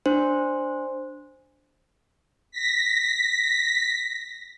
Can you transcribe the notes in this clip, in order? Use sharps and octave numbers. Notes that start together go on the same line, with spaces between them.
D4 C5
A#6 B6